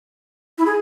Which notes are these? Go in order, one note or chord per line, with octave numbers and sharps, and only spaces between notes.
E4
G#4